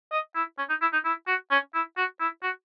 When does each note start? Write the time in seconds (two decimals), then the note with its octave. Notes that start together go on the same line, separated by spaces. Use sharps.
0.12 D#5
0.35 E4
0.58 C#4
0.69 D#4
0.82 E4
0.93 D#4
1.05 E4
1.27 F#4
1.51 C#4
1.74 E4
1.97 F#4
2.20 E4
2.43 F#4